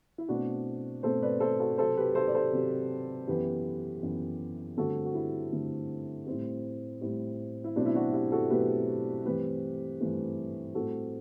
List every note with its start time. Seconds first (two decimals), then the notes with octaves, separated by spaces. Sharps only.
0.18 E4
0.28 B2 A3 C4 D4 F#4
1.03 B2 A3 C4 A4 C5
1.22 B4 D5
1.40 A4 C5
1.59 F#4 A4
1.78 C3 F#3 C4 A4 C5
1.97 G4 B4
2.15 A4 C5
2.28 D5
2.35 A4 C5
2.52 C3 F#3 C4
3.27 F#2 E3 B3 G4 B4
4.02 F#2 E3 B3
4.77 G2 D3 A3 C4 F#4 A4
5.05 F#4
5.14 E4 G4
5.52 G2 D3 A3 C4
6.27 A2 G3 C4
7.01 A2 G3 C4
7.64 E4
7.76 B2 F#3 A3 C4 D4
7.86 E4
7.95 D4 F#4
8.13 E4 G4
8.32 F#4 A4
8.50 B2 F#3 A3 C4 G4 B4
9.25 G2 E3 A3 C4 G4 B4
10.01 G2 E3 A3 C4
10.74 A2 G3 C4 F#4 A4